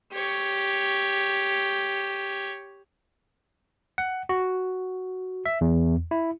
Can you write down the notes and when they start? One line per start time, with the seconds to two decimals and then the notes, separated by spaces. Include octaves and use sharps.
0.13 G4 C#5
3.98 F#5
4.29 F#4
5.46 E5
5.61 E2
6.11 E4